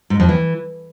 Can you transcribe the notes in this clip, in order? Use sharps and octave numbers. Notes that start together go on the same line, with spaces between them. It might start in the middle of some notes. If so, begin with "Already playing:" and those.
G#2
F2
E3